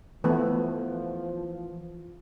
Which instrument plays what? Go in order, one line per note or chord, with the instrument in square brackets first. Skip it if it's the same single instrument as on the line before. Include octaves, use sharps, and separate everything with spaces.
[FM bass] E3 [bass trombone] F3 [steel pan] A3 B3